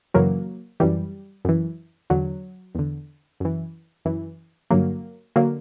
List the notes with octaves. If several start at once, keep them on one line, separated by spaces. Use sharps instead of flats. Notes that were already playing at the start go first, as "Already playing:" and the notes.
F#2 C#3 E3 F#3 A#3
F#2 E3 G3
F#2 E3
E2 D3 F#3
E2 D3
F#2 E3
F#2 E3
G2 D3 F#3 A#3
D3 F#3 A#3